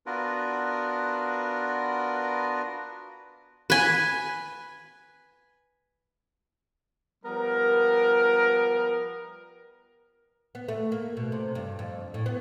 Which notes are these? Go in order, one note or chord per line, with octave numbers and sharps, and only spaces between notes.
B3 D4 F4 F#4 A#4 B4
B4 G#5
F3 G3 B3 A#4
B3
A3
A#3
B2
C3
G2
F2
A2
B3